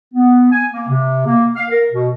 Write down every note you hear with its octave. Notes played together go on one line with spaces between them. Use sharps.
B3
G#5
A#3
C3
A#3
F5
A#4
B2